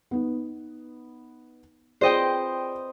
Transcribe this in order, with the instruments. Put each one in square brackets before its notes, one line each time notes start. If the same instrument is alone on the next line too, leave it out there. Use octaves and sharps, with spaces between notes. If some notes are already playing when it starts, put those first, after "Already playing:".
[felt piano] B3 D#4
[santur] C4 B4 [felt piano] F4 G#4 D5 [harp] C5 D#5 G5